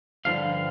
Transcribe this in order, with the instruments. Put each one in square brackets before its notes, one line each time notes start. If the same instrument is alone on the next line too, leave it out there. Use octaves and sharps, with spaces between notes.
[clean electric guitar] G2 D3 F3 F5